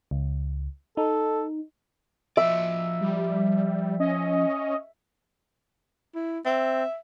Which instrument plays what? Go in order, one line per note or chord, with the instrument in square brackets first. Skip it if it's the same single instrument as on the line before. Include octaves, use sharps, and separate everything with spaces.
[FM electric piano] C#2
[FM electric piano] D#4 [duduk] A4
[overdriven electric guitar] F3 D5 [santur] E5
[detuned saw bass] G3
[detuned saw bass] C#4 [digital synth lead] D#5
[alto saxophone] E4
[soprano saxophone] C4 [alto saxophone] E5